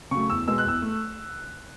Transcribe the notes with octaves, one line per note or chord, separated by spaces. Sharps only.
C#3 F#3 A3 C#6
E2 E6
B2 G#3 B3 E6
F#6
E2 E6
A3